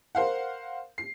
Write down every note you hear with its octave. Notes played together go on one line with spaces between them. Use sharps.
A#4 C5 F5 F#5
C7